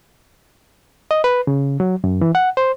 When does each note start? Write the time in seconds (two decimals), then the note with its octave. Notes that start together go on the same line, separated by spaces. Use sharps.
1.11 D#5
1.24 B4
1.47 C#3
1.80 F#3
2.04 F#2
2.21 E3
2.35 F#5
2.57 C5